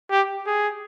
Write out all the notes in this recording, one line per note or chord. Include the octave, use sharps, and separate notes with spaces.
G4
G#4